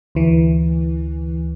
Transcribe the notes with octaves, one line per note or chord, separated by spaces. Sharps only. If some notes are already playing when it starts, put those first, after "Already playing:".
D2 E3